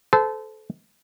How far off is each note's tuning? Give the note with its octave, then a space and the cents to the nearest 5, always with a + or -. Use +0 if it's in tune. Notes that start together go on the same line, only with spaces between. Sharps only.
A4 -20 C5 -35